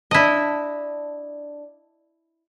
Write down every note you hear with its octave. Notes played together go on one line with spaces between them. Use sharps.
D4 E4 D#5 A5